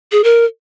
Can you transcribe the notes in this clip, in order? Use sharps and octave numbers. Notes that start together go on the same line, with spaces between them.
G#4
A#4